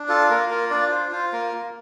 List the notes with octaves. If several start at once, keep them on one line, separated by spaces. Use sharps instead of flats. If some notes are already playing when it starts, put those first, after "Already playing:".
Already playing: D4
F4 A4
A#3 A#4
F4 A#4
D4 D5
F4 C5
F4 C5
A#3 A#4
A#3